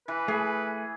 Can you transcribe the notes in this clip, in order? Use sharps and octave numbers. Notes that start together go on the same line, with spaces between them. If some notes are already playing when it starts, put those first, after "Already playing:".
E3 B4
A3 G#4